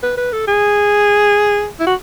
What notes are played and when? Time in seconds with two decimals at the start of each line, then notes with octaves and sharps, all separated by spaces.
0.03 B4
0.17 B4
0.32 A4
0.47 G#4
1.79 E4
1.86 F#4